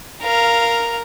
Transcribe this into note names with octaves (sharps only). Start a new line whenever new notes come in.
A#4 F5